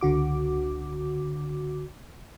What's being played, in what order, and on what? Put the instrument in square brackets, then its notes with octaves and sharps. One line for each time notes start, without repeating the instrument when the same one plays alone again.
[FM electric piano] C#2 D3 F#4 D6